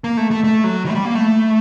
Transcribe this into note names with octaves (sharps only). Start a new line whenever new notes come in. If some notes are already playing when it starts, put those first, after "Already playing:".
A#3
A3
A3
A3
F#3
D#3
A3
G3
A#3
A3